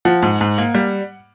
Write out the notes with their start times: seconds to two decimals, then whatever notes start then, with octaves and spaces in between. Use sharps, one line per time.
0.05 F3 F#5
0.22 G#2
0.41 G#2
0.58 A#3
0.75 G3